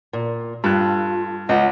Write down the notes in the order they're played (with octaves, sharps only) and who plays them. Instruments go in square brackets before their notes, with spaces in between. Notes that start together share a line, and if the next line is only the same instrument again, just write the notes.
[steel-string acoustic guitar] A#2
[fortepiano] G2 F#6 [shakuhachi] F4 [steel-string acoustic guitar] A4
[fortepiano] C#2 [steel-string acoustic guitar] B3 D#5 [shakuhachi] F#5